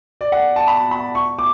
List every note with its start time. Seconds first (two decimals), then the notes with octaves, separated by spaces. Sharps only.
0.21 D5
0.32 F#5
0.56 A5
0.68 B5
0.91 B5
1.15 C#6
1.39 D6